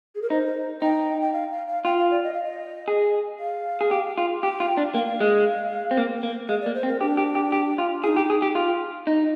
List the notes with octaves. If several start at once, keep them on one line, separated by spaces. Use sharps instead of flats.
G#4
A#4
D#4 C5
D#4 G5
G5
F5
F5
F5
F4 G5
F5
D5
D#5
F5
D#5
G#4
F5
G#4
G4
F4
G4 G5
F4
D4
A#3 G5
F5
G#3
C4
A#3
A#3
G#3 F5
D5
A#3
C5
C4
A#4
D4 G4
G4
G4
G4
F4
F4 G#4
D#4
G4
G#4
G4
F4
D#4